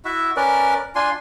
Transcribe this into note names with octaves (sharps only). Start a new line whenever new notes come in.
E4 F#4 E5
C#4 A#4 B4 D5
D4 F4 G#5 C6